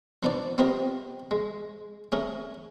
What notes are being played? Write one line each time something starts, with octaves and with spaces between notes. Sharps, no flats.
F3 B3 D4 D#4 D5
B3 C4 F4 G4 A#4 D#5
G#3
A3 C#4 G#4 A#4